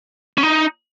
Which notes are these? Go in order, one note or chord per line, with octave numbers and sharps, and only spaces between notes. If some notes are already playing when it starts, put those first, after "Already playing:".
C#4
D#4